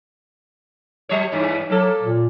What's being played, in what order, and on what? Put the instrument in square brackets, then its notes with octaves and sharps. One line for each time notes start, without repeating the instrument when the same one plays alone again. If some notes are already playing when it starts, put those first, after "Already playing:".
[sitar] F#3 C#5
E2 G2
[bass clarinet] F#3 [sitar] A#3 A4
[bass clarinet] A#2